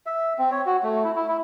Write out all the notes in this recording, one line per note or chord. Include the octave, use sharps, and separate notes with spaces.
E5
C4
C#5
F#4
A3
E4
E4
E4